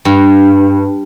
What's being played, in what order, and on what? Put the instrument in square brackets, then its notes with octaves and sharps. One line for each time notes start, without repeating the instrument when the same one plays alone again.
[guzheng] G2